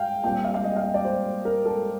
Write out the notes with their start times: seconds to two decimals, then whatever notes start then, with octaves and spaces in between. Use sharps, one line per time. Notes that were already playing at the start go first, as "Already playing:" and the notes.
Already playing: F5 G5
0.24 A#2 G3 C4 G5
0.44 F5
0.54 F5
0.64 D#5
0.76 F5
0.84 D#5
0.94 D5
1.05 C5
1.45 A#4
1.65 A4